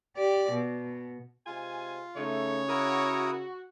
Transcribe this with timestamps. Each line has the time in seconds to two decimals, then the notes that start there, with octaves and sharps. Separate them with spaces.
0.16 G4 D5
0.52 B2
1.46 C3 G#3 F4 G#5
2.17 C#3 A3 D#4 C#5
2.69 E4 F#4 A#4 D#6